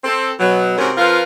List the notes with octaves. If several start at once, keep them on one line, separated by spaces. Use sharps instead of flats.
C4 A4
B2 F#3
G#2 C3 C#4 F#4 A#4
F2 F3 F4 A#4 B4 F5